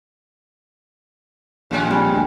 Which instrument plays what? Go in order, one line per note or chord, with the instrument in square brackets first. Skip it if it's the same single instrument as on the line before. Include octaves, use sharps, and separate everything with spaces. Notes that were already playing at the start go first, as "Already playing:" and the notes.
[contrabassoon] A#1 [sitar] D#2 G#3 C#4
[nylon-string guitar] G3 [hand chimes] C4 G5 G#5
[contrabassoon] D2